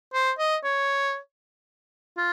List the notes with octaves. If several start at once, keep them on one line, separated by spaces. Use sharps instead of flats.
C5
D#5
C#5
F4